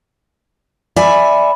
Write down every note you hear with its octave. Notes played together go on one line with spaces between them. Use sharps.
D5 E5 G#5 B5